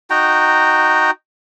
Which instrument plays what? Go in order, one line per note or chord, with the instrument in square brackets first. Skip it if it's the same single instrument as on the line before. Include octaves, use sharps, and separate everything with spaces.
[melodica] D#4 F#4 G5 A#5